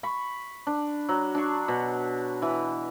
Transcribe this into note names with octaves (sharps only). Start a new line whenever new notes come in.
B5 C#6
D4
F#3
D4 C#6
B2
E3